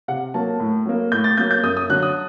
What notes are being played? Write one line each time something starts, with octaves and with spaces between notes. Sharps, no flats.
C3 F#5
F#3 A#3 A5
A2
F#3 A#3
A2 G6
A6
F#3 A#3 G6
G6
F#2 D#6
D#6
D3 F#3 F#6
D#6